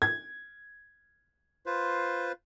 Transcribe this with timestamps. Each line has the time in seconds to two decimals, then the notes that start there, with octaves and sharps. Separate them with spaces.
0.02 G#6
1.66 F4 B4 C5